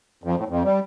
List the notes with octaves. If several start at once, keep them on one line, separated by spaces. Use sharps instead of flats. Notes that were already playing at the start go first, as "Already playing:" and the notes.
F2
A2
F2
G3